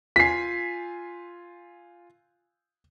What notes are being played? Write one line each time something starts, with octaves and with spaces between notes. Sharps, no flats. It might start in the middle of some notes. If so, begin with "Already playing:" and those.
F4 G#5 B6 C7